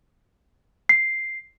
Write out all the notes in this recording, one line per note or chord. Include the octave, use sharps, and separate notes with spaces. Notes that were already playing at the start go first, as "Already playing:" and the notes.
C7